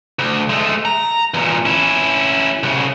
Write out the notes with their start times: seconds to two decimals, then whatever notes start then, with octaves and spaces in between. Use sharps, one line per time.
0.19 D2
0.49 G#3 A3
0.85 A#5
1.34 E2 A#2
1.66 C#4 E4
2.63 C2 C#3